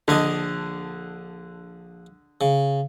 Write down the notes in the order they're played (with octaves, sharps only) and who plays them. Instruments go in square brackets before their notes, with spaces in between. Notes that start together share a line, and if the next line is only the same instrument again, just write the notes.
[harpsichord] A#1 D4 G#5 [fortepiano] D3 D#5
[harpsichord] C#3